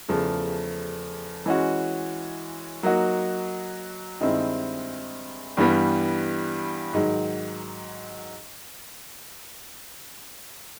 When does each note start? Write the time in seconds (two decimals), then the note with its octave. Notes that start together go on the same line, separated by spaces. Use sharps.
0.09 E2 C#3 F3 A3
1.46 E3 G#3 C#4 F#4
2.83 F#3 A#3 D#4 F#4
4.21 G2 D#3 G#3 C4 E4
5.57 G2 E3 G3 B3
6.94 G#2 D#3 F#3